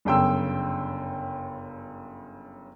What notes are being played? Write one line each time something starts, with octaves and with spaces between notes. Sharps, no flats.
G1 F#2 C#3 G5 C6 E6